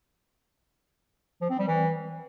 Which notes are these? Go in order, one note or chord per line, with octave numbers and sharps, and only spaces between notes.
F3
C4
G3
E3